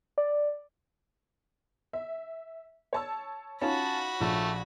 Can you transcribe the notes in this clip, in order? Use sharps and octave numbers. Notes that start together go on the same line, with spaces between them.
D5
E5
C#5 A5 E6
C#4 D#4 F4 F#4 A5 B5
A#1 A3